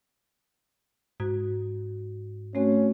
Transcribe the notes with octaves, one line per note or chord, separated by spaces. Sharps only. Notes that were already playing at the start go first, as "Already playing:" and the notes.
G#2 F#4
A3 C4 C#4 F#4